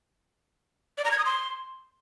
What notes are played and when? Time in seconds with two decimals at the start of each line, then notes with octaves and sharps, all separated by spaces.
0.98 D5
1.05 A#5
1.11 G#6
1.18 D#6
1.25 C6